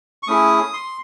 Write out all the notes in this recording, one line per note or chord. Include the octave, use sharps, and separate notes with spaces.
C#6
A3 C#4 E4 G#4 D#6
C6